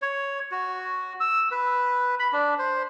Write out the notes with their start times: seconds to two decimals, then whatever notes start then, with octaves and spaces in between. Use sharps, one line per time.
0.02 C#5
0.51 F#4
1.20 E6
1.51 B4
2.19 B5
2.33 D4
2.59 C5